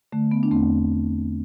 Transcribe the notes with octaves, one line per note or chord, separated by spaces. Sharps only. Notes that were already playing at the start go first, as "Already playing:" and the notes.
D3 A3
B3
D4
E2 A3 C4